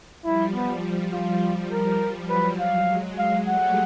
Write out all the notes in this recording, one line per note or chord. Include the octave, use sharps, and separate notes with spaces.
F3 G3 E4
B3
F3 G3
F4
F3 G3
A#4
F#3 B4
F5
F#3 G#3
F5
G3 A3 F#5